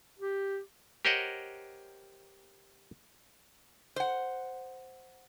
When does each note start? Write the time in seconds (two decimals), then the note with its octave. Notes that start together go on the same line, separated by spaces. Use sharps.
0.19 G4
1.05 G4 A#4 C5 C#5 D#5 F#5
3.96 C5 F#5